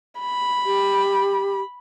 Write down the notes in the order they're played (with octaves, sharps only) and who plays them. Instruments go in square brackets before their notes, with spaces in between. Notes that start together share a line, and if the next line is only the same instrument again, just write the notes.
[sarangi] B5
[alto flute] G4